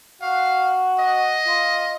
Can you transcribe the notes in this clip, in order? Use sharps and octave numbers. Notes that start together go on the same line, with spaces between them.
F#4 F5
D#5
F4